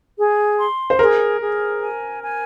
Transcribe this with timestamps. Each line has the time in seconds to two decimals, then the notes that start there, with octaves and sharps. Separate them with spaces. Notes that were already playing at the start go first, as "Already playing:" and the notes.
0.17 G#4
0.58 C6
0.90 C5
0.99 G#4 A#4
1.40 G#4
1.81 G#5
2.22 G#5